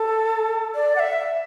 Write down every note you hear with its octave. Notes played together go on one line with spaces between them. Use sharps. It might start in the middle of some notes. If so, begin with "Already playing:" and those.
Already playing: A4
D5
F#5
E5